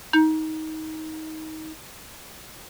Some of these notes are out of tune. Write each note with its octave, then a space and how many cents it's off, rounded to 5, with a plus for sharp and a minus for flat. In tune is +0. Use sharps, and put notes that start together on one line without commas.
D#4 +20